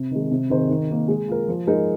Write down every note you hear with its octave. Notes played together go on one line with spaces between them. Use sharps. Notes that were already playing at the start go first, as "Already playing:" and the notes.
Already playing: C3
D#3 G#3
C3
D#3 C4 G#4 C5
D#3
A#3 D#4
G#3
F4 A#4
F3
G#3 D#4 A#4